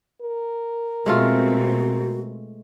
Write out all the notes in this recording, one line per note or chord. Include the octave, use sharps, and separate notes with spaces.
A#4
B2 G#3 A3 C4 F4 F#4